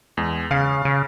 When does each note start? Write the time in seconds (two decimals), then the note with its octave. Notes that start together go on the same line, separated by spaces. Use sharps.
0.17 E2 G#3
0.51 C#3 F5
0.85 C#3